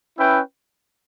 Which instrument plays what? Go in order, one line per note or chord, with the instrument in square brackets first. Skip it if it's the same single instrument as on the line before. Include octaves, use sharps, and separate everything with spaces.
[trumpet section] C#4 E4 B4 E5 G5